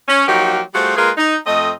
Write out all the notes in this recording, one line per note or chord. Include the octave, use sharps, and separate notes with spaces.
C#4
F3 F#3 A#3 D#4 F#4 G4
G3 A3 F4 F#4 G#4 C5
G#3 A#3 F4 G#4 A#4 B4
D#4
F2 A3 C4 D#5